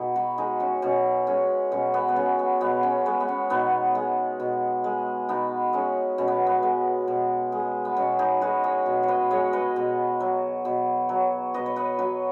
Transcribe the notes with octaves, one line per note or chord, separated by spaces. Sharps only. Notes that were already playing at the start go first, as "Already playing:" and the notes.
Already playing: B2 D#4 G#4
F#4 B4
G#3 D#4 G#4
C#4 F#4
B2 C#4
G#3 C#4
B2 C#4
B3
B3
G#3 C#4
B3
B2 B3
C#4
G#3 B3
B3
C#4
B2 B3 D#4
G#3
B2
G#3
B2 B3 D#4
G#3 C#4
B2 C#4
B3
B3
G#3
B2
G#3
B3
B2 C#4
D#4 G#4
G#3 F#4 B4
G#4 C#5
B2
C#5
B4 D#5
G#3 C#5 F#5
B4 D#5
B2
F#3
B2
F#3
B2 B4 D#5
C#5
B4 D#5
F#3 F#4 B4